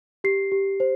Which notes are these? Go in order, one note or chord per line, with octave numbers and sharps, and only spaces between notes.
G4 C7
G4
C5